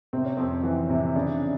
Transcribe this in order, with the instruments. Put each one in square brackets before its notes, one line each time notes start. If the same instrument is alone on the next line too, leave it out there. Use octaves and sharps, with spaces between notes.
[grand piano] C3 [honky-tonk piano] C4
[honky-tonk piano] C#4
[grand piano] F2 [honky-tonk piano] C4
[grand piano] E3
C3
[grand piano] C#3 [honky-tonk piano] D4